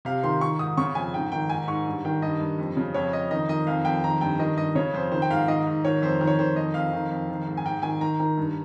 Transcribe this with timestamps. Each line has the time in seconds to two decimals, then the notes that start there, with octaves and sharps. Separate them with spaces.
0.05 C3 F5
0.24 D#3 C6
0.41 D#3 C#6
0.59 G#2 D#6
0.77 C#3 C#6
0.95 F2 G#5
1.14 G#2 G5
1.32 D#3 G5
1.50 G#2 G#5
1.68 G#2 C#6
1.87 G2
2.05 D#3 G5
2.22 G2 D#5
2.40 G2
2.59 F2
2.77 C#3
2.94 F2 C#5
3.12 F2 D#5
3.31 D#3 D#5
3.49 D#3 D#5
3.67 F2 F5
3.85 F2 G5
4.04 D#3 A#5
4.21 G2 G5
4.39 D#3 D#5
4.57 G2 D#5
4.75 C#3 C#5
4.94 F2 C5
5.12 D#3 C5
5.22 G5
5.31 G#2 F5
5.48 D#3 D#5
5.67 G#2
5.85 D#3 C#5
6.02 F2 C5
6.21 D#3
6.27 C#5
6.39 D#3 C5
6.56 F2 D#5
6.74 F2 F5
6.93 D#3
7.12 F2
7.30 D#3
7.47 G#2
7.57 G#5
7.65 G#2 G5
7.83 D#3 G#5
8.01 D#3 A#5
8.20 D#3
8.37 G2